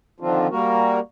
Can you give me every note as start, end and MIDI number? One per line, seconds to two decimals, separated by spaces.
0.20 0.47 50
0.20 0.47 51
0.20 0.47 53
0.20 0.47 60
0.20 0.47 62
0.20 0.47 65
0.50 1.00 55
0.50 1.00 58
0.50 1.00 66
0.50 1.00 70